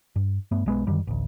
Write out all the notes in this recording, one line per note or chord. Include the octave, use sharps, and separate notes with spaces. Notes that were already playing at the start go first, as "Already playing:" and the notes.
G2
G2 A3 B3
B1 G#3 B3
F#2 D3 D#3 G3
A1 D2